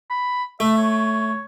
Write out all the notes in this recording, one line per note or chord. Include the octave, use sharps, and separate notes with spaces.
B5
A3 E5
C#5